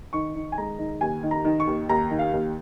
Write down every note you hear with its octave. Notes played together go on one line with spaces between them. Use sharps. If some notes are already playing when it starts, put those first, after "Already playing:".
D#3 C#6
D#3
G#5
G#3 A#5
D#3
D#2 G#5
D#3
A#5
D#3
C#6
D#2
D#2 A#5
D#3
F5
D#2